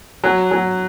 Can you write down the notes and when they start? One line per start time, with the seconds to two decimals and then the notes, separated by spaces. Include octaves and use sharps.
0.24 F#3
0.51 F#3